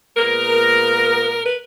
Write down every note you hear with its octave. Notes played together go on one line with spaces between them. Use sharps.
A#2 G#3 B3 A#4
B4